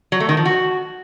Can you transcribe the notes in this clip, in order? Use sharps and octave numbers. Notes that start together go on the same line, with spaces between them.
F#3
A3
D#3
F3
F#4